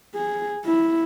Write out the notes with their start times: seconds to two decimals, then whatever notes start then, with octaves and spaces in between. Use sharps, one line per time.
0.15 G#4
0.65 E4